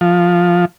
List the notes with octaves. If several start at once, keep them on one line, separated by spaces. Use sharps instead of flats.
F3